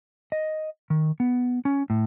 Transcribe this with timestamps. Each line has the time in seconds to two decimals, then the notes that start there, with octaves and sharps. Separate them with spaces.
0.32 D#5
0.90 D#3
1.20 B3
1.65 C#4
1.90 A2